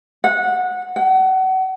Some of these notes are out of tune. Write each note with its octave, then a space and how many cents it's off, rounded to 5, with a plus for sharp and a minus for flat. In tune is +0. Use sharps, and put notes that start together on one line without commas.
F#5 -20
F#5 +35